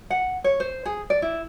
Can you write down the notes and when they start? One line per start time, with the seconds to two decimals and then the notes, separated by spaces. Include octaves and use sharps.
0.10 F#5
0.44 C#5
0.60 C5
0.86 G#4
1.10 D5
1.22 E4